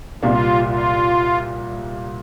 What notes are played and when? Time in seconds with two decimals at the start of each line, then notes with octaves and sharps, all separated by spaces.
0.23 C2 A#2 G3 A#3 F4
0.64 F4